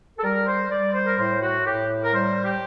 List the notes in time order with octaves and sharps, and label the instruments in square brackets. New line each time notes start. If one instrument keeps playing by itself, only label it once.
[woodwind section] A4
G3 A#4
C5
G3 D5
C5
A#4
A2 C5
F#4
A2 G4
A#4
G3 C5
G4